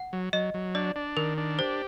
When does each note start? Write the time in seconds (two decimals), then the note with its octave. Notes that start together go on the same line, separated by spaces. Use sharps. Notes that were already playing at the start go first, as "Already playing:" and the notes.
Already playing: F#5
0.13 F#3
0.33 F#3 D#5
0.54 F#3
0.75 D4 D5
0.96 D4
1.17 D#3 A#4
1.38 D4
1.59 G4 C5